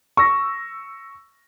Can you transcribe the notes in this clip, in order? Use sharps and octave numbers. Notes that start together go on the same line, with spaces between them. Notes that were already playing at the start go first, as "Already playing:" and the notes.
C#6 E6 A#6